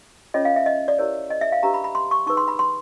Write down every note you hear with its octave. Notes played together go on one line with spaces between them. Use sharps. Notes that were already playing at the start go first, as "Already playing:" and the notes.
C#4 F4 A4 C#5 D#5
F5
E5
D#5
D5
E4 G4 A#4 C#5
D#5
E5
F5
D4 G4 B4 A#5
B5
B5
C6
C#6
D#4 G#4 B4 C#6
C6
B5
C6